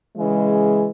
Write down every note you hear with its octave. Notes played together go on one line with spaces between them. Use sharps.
C#3 E3 G#3